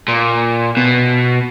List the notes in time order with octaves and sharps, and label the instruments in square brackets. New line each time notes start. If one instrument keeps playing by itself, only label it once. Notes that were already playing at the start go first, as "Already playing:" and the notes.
[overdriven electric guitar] A#2
B2